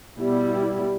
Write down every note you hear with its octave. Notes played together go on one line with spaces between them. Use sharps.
B2 G3 B3 E4